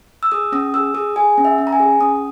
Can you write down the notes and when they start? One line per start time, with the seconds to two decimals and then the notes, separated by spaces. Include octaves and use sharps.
0.23 E6
0.32 G#4 D#6
0.52 C#4 D#6
0.74 G#4 E6
0.94 G#4 D#6
1.16 G#4 G#5
1.38 C#4
1.45 E5
1.58 C#4
1.67 A#5
1.73 G#5
1.80 G#4
2.00 C#4 D#6